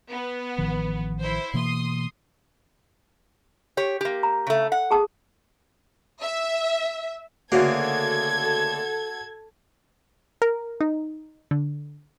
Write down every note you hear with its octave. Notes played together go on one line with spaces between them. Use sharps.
B3
A1 D#3 F3
E4 C5
B2 E3 A#3 C6 D#6
G4 C#5
A#3 G4
A#5
C#3 A3
F#5
G#4 A5 D#6
E5
D2 C#3 A#3 F#4 A4 G#6
A#4
D#4
D3